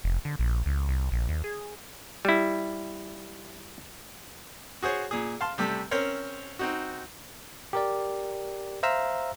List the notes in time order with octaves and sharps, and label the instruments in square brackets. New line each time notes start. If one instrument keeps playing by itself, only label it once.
[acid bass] F1
D3
A#1
C#2
C2
A#1
D#2
G#4
[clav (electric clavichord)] G3 E4
[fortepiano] F#4 G#4 C5 C#5
A#2 G#4
F5 A5 C6
C3 G3 A3
C4 C#4 A#4 C5 C#5
C4 D#4 F#4
[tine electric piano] G4 A#4 D5
C5 E5 F5 A#5 E6